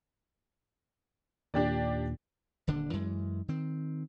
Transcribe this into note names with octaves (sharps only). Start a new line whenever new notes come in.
D#2 A#2 D4 G4 D5
D#1 D3 D4
F#2 E3 G#3
D#3 C4